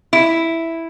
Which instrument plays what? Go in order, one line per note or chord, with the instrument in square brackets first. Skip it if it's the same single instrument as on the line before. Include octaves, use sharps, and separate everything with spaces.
[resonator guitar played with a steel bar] E4